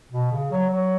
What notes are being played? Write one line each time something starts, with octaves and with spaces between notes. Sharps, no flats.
B2
C#3
F#3
F#3